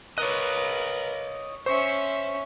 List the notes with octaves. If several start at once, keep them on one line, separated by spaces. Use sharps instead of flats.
A#4 B4 C#5 D#5 F#6
C#4 C5 E5 C#6